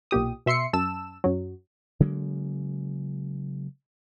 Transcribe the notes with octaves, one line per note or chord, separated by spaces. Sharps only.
B1 A#2 G4 D#6
B2 E5 C6 C7 C#7
F#2 A5 E6 E7
F#2 F#3
C#3 F#3 G#3 A#3